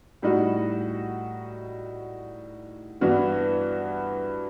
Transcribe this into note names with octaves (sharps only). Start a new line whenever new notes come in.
A2 G3 D#4 F#4
G2 E3 B3 F#4